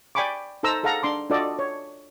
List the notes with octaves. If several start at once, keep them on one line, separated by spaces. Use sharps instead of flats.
D5 G5 G#5 B5 C#6 D6
D#4 A4 C5 A#5 E6
G#4 A4 F5 F#5 A#5
D4 C6 D6
D4 F4 F#4 A4 D5 D#5
C#5